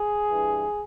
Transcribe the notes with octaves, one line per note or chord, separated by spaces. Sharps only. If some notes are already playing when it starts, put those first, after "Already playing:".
Already playing: G#4
G2 E3